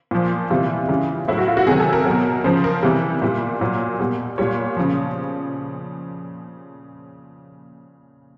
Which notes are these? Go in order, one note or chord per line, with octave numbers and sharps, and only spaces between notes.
A#2 F3
C3 E3 G3 F4
C#3 E3 G3
A2 F#3 E4
F#4
F4
F#4
C3 D#3 F#3 G#4
A4
A#4
B2 F#3
C#3 F3 C5
A#4
C3 E3 G3
A#2 G3
A#2 F#3
B2 G3
A#2 G3 C#5
C#3 F3